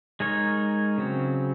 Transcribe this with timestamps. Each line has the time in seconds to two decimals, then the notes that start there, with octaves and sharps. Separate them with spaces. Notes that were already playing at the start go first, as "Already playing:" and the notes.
0.20 G#3 D#4 A#4 C#5
0.98 C#3 F#3 C4